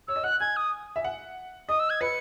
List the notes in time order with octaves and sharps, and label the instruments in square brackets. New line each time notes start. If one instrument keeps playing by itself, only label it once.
[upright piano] C#5 [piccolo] E6
[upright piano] D#5
[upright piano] F#5 [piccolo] F#6
[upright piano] G#5 [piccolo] G#6
[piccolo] D#6
[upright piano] E5
F#5
[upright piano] D#5 [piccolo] D#6
[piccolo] E6
G#6
[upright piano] B4 [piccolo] C#7